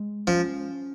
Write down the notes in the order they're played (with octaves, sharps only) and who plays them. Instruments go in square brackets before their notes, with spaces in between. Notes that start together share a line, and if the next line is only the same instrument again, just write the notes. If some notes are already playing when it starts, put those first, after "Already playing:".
Already playing: [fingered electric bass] G#3
[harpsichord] F3 [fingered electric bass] C#4